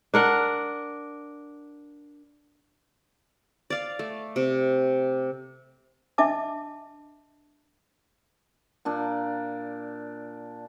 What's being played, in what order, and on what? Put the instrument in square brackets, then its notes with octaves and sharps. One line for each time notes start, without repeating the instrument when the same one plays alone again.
[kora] D4 A#4 F#5
[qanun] D5 F5
A3
C3
[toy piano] D4 D#5 E5 A5 D6
[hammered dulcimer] A#2 D4